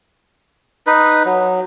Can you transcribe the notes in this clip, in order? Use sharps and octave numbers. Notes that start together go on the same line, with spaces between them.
D#4 B4
F#3